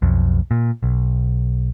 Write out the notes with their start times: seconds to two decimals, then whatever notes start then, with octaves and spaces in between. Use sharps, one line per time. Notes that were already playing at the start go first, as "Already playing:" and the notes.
0.02 B1 F2
0.51 A#2
0.83 B1